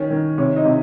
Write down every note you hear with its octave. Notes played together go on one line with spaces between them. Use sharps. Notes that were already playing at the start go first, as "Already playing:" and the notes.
Already playing: D#3 C#4 C#5
D#3
C3 C#5
D#4 D#5
C3